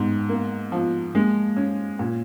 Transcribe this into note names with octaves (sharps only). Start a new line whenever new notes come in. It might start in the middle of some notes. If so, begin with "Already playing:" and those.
Already playing: G#2 B3
A#3
F3
G#3 A#3
C#4
A#2